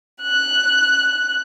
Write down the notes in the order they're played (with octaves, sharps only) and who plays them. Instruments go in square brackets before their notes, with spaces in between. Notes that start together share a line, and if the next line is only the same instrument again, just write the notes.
[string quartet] F#6